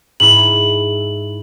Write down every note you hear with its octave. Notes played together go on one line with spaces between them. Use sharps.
G#2 E4 F#7